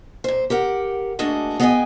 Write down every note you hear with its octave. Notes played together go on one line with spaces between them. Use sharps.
A#2 C5
G4 A#4 F#5
A3 A#3 D4 F#4 G#4 D#5
B3 G#4 D#5 E5 G5 G#5